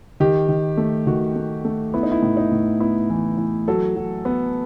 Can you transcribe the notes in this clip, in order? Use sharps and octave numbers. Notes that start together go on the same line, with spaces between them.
D#3 G4
D#3
A3
D#3 F#4
A3
A3
B3 E4
D#4
E4
A2
D#4
A2
B3 E4
E3
E3
F#3 A4
F#3
B3